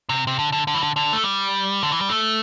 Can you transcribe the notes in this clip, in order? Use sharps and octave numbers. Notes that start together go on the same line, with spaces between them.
C3
C3
D3
D3
D3
E3
D3
D3
A3
G3
D3
E3
G3
A3